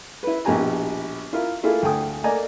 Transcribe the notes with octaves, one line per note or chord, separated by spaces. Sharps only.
E4 B4
A#1 B2 E4 G4 G#5 A#5
E4 F4 A#4
A3 A#3 E4 F4 G#4 A4
D2 G5 G#5 D#6
A3 A#3 D5 D#5 G#5 A#5